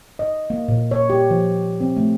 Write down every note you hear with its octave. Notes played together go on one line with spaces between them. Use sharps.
D#5
A#3
A#2
C#5
G4
F3
C4
A3